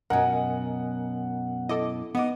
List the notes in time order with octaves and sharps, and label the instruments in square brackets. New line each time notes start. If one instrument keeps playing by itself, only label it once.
[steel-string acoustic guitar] F#2 B2 [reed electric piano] A#4 D#5 G#5 [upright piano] F#5
[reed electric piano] E4 D6 [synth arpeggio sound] A4 D#5
[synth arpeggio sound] B3 [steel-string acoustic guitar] D#4 D#5 [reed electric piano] F#5 D6